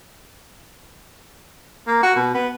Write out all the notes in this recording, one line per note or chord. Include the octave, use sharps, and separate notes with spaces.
A#3
F#4
B2
B3